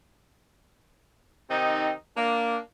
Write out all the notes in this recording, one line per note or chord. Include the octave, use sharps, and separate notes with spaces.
C3 D#3 C4 D#4
A#3 D4